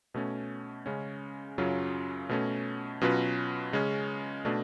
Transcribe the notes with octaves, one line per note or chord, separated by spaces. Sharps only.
B2 A3 C#4
C#3 G#3 C#4
F#2 C#3 F#3 C#4 F4
B2 A3 C#4
B2 F#3 C#4 F4 B4
C#3 G#3 C#4
B2 A3 D4